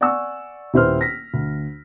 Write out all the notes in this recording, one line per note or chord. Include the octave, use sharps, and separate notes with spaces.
D5 F#5 G#5 C#6 E6
D#1 E4 B4 C5 C6 F6
A#6 B6
D2